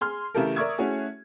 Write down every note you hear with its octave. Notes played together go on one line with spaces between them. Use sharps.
G#4 C6 F6
C#3 E3 A3 G4 A4 A#4
A#4 D5 E5 C#6 D#6 G#6
A3 C#4 E4 F#4 G#4